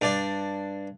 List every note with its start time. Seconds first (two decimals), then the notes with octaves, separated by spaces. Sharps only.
0.01 G2 D4 D5